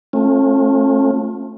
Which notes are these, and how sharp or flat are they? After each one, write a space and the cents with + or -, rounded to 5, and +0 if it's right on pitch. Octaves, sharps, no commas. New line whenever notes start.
A3 +0 C#4 -40 F4 +15